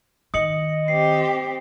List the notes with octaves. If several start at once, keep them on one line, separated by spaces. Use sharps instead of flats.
D#3 D#5 D#6 C#7 F#7
C4 G4 C7